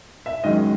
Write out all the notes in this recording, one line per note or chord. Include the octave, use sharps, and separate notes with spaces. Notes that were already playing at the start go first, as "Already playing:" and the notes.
E5
F#2 D#3 G#3 D#5